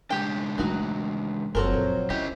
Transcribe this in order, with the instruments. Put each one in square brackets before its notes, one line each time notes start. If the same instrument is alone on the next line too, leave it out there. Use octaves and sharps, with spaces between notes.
[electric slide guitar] C#3 G#3 D4 [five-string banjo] G4 G5
[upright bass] E3 A3 [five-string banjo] F#3 D#4 F#4
[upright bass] F#1 [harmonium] F2 F#3 C5 [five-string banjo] F#4 A4 A#4
[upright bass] A#2
[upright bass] C#3 [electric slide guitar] C#4 D#5 [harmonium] E4 [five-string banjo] G4